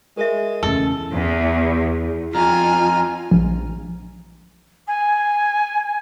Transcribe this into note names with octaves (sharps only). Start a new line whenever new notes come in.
G#3 A#4 E5
E2 C#3 A4
E2
F2 F4 G#5 A#5 F6
A#1
G#5